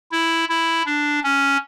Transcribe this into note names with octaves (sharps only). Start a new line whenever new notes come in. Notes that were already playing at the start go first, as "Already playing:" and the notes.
E4
E4
D4
C#4